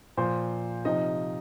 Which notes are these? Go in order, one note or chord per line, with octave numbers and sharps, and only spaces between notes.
A#2 F3 C5 C6
C3 F3 D#4 D#5